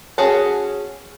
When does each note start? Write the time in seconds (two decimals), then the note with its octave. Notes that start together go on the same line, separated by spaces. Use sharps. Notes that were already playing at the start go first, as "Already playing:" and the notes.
0.18 C#4 F#4 G#4 F#5 A5